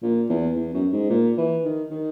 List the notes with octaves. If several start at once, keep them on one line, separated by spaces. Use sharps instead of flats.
A#2
E2
E2
F#2
G#2
A#2
E3
D#3
D#3